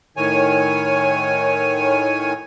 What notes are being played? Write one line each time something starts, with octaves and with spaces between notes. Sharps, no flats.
A2 D#3 C#5 G#5